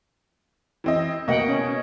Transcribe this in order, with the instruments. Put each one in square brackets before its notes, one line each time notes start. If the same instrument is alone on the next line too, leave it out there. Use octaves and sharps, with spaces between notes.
[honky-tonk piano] E3 C4 D#5
[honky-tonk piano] B2 D#5 [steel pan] A#3 F#5 G5
[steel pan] C#4